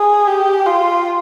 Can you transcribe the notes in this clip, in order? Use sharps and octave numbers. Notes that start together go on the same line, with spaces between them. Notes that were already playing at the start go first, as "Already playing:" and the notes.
Already playing: G#4
G4
F4